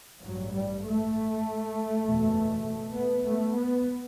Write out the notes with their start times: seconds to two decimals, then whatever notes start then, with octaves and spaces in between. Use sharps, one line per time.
0.22 A1 G2 F#3
0.53 G3
0.83 A3
2.04 F#1 E2 B2
2.95 B3
3.25 A3
3.57 B3